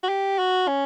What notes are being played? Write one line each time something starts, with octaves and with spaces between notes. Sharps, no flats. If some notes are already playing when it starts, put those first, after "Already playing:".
F#4
G4
F#4
C#4